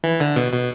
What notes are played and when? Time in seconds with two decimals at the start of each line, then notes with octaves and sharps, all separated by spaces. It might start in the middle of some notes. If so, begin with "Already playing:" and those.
0.04 E3
0.20 D3
0.36 B2
0.52 B2